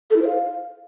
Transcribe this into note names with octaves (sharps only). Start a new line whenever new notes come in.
A4
E4
C5
F5